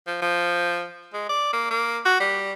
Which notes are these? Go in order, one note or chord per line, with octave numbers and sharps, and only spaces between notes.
F3
F3
G#3
D5
A#3
A#3
F#4
G3